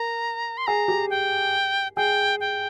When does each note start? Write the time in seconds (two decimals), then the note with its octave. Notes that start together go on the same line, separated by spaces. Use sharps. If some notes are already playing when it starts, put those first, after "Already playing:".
Already playing: A#4 A#5
0.58 C6
0.67 G#4 A#5
0.88 G4
1.10 G5
1.97 G#4 G5
2.40 G5